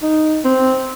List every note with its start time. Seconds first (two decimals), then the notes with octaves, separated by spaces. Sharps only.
0.02 D#4
0.45 C4